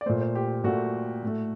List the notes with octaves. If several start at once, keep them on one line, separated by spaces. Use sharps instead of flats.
D5
A#2 A3 C5
C5
G4
A#2 A3 F#4
A2 A3